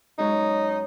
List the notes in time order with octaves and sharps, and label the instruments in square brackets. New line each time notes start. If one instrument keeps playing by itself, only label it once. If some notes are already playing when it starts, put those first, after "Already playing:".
[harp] F#2 G#3 C#5 [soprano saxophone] D#4